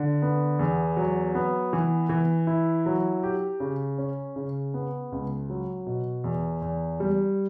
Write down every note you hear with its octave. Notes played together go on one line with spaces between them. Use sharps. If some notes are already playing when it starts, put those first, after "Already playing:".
Already playing: D3
B3
E2
F#3
B3
E3
E3
E4
F#3
G4
C#3
C#4
C#3
B3
C#2
F#3
B2
E2
E2
G3